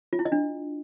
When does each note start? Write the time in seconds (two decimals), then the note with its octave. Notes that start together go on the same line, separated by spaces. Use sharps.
0.13 F4
0.19 E4
0.25 D#5
0.32 D4